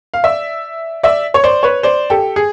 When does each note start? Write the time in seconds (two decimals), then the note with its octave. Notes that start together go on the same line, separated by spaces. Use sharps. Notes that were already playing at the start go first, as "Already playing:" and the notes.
0.14 F5
0.24 D5 E5
1.03 D5 E5
1.34 C#5
1.44 C5 D5
1.63 B4 C#5
1.83 C5 D5
2.10 G4 A4
2.36 G#4